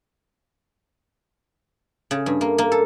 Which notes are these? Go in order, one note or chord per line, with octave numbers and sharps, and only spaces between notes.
C#3
G2
A#3
A#3
A4